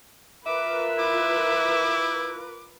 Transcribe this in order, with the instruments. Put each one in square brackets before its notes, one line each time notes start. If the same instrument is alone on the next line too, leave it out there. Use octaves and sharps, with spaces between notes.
[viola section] F4 A#4 B4 [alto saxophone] E5 [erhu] D6
[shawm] E4 [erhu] D6